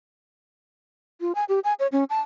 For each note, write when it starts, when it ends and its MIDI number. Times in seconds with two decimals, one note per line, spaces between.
1.21 1.32 65
1.35 1.44 80
1.49 1.60 67
1.64 1.73 80
1.80 1.87 73
1.92 2.04 61
2.10 2.20 81